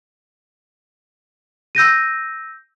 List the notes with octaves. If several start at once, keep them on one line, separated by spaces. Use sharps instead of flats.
E6 G6 A#6 D#7